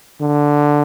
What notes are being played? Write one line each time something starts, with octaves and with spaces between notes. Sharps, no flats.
D3